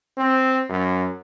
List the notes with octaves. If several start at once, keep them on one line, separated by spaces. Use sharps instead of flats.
C4
F#2